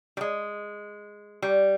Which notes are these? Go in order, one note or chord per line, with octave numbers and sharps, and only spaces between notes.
G3
G#3
G3